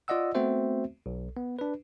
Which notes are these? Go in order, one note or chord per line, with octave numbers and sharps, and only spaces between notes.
F4 D5 D#5 F#5 E6
A3 B3 C4 F#4 C5 E5
B1
B3
D4 B4